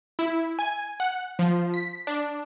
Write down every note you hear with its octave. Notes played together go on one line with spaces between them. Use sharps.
E4
G#5
F#5
F3
B6
D4